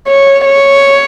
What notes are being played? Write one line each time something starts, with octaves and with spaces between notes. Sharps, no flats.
C#5
C#5